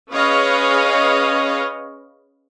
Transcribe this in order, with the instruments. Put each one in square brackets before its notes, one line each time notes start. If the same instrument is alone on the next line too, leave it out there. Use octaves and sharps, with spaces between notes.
[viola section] C#4 G#4 B4 C#5 D#5 F5